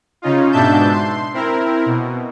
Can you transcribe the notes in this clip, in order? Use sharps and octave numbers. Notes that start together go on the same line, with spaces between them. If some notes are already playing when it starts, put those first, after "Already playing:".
C#3 C#4 D#4 F4
G#2 B2 D4 E5 A5 G6
C6
C4 E4 A#4
B2